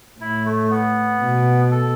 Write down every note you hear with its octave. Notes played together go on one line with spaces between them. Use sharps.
A2 E4
A3
B3
B2
A4